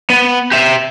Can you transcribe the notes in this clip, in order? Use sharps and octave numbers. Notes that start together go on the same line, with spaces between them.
B3
G4 E5